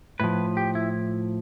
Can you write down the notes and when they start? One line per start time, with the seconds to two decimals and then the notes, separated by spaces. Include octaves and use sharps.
0.20 A2 F3 B4
0.57 G4
0.75 E4